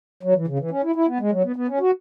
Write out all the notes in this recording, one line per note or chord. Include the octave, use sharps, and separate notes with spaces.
F#3
E3
C#3
E3
C#4
E4
E4
B3
G#3
F#3
B3
B3
C#4
F#4